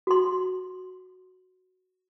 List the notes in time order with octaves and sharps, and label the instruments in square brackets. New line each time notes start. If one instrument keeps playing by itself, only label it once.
[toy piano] F#4 C6